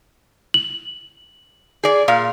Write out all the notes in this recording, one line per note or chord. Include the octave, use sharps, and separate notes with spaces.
F#7
G#4 D5
A#2 F5